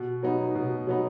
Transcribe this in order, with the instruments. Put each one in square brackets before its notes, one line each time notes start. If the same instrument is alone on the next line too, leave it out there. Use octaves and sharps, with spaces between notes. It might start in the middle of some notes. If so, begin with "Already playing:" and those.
Already playing: [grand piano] B2
F#3 B3 D#4
B2
F#3 B3 D#4